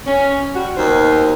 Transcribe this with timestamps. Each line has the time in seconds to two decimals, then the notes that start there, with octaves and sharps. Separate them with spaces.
0.06 C#4
0.55 G3 F#4
0.77 D#2 B2 D#4 C5